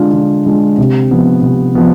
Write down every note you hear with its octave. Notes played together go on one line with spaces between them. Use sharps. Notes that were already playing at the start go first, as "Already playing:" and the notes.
Already playing: D3 G#3 D4 F4
D3
G#3 D4 F4
C3
F3 B3
C3
F3 B3